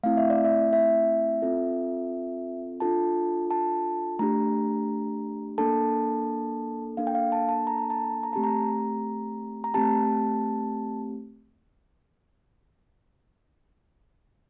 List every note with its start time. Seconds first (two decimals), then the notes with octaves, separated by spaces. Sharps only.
0.03 A3 C4 E4 F5
0.17 E5
0.30 D5
0.45 E5
0.73 E5
1.42 C4 F4 A4
2.80 D4 F4 A4 A5
3.51 A5
4.19 A3 D4 G4 A#5
5.58 A#3 D4 A4 A5
6.97 A#3 D4 A4 F5
7.07 G5
7.15 F5
7.32 A5
7.49 A5
7.67 A#5
7.78 A#5
7.90 A5
8.23 A#5
8.33 A3 C4 G4 A5
8.44 A#5
9.64 A#5
9.74 A3 C4 G4 A5